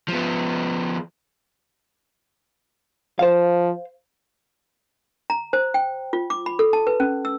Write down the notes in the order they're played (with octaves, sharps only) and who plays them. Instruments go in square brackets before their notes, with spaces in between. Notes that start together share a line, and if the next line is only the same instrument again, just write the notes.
[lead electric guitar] F3 B3
[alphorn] F3 [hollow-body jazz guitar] C5 F5
[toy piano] A#5
C5
G5
F4
D6
B5
A4
A5
B4
C#4
E6